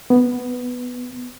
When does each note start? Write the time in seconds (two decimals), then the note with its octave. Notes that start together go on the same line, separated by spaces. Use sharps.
0.10 B3